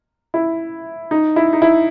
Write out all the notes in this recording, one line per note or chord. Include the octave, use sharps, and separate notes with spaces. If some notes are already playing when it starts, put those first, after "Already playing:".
E4
D#4
E4
D#4
E4